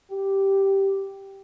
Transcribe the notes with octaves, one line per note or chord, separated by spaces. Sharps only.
G4